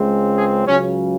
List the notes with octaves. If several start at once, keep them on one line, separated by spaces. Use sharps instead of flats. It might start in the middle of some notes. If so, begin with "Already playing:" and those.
Already playing: C#2 C#3 G#3 C4
G#4
C#2 C#3 F#3 C#4